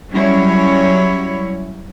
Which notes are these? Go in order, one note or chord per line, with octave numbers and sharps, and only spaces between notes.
F#3 G3 C#4 E4 C#5